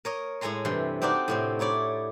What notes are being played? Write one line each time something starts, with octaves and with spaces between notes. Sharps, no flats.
A#4 C#5 D#5
A2 G#3 A4 G#5 A#5 C6
G2 C3 E3 C6
C4 D4 D#4 F#4 G4 D5
A2 C3 C4
D#4 E4 C#5 D5